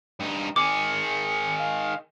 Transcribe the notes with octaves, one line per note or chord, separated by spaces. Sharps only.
G2 D#4
D#3 G#4 D6 C#7
F5